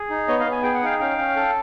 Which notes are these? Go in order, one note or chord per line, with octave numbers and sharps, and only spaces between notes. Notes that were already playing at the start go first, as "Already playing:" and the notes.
Already playing: G#4
D#4
B3 C#5 D#5
D#5 F5
B3
G#5
G#4 G5
F#5
D#4 F5 G5
C#4 F5 G5
C#4
A4